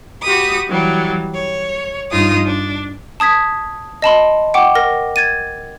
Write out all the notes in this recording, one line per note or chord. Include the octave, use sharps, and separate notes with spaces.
F#4 G4 B5 D#6
E3 F#3 G3
C#5
G2 D#4 F4 D#6
D4
A5 D#6 G#6 B6
D#5 A5 B5 C6
F#5 G5 C#6 D6
A#4 A#6
G#6 A6 D#7